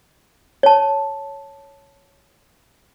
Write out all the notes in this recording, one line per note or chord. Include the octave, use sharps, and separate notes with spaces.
C#5 A5